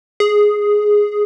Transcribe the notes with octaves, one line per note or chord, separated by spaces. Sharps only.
G#4